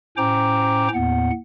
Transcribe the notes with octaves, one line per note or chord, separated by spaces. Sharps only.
A2 C#4 C5 G5 A#5 D6
D#2 A2 B3 F#5